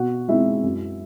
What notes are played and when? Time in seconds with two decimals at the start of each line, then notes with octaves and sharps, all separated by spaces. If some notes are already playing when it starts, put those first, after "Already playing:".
Already playing: B2 F#4 F#5
0.28 G#3 C4 D#4 E4 E5
0.63 F#2